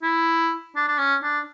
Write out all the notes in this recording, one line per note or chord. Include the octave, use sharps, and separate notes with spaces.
E4
D4
D4
C#4
D4